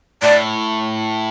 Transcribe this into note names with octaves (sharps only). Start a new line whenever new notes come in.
A2 D5